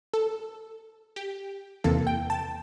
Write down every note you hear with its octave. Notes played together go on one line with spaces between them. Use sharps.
A4
G4
E2 C3 E3 A#3 A4
G5
A5